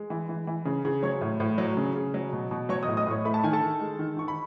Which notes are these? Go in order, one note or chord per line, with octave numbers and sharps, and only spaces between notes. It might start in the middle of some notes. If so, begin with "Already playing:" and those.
Already playing: G#3
E3
E3
E3
C#3
C#3
F#3 C#5 C#6
A2
A2
F#3
C#3
C#3
F#3
B2
B2
F#3 C#5 C#6
A2 D#5 D#6
D#5 D#6
A2 C#5 C#6
A3 B5
A5
D#3 G#5
A4 A5
D#3
G#3
D#3
D#3 C#6
B5